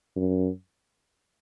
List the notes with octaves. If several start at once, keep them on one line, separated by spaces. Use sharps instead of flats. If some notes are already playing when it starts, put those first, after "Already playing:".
F#2